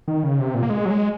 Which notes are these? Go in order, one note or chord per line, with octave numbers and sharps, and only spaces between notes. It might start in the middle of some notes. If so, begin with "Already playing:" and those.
D#3
C#3
C3
A#2
A#3
G#3
F#3
G#3